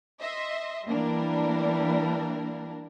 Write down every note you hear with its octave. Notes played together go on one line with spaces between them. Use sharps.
D#5 E5 C6
E3 G3 A#3 D4 A#4